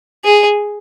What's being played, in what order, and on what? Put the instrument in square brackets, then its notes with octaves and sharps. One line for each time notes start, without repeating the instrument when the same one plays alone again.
[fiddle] G#4